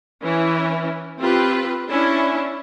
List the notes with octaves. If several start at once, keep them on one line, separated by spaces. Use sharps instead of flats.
E3 C#4 E4
C4 F4 G4 B4
C#4 D4 E4